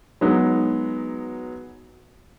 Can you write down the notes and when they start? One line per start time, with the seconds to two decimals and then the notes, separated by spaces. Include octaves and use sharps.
0.21 F#3 G#3 B3 D#4